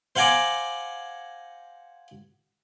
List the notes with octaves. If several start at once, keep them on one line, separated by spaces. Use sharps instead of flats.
C5 F5 F#5 G#5 A#5 D6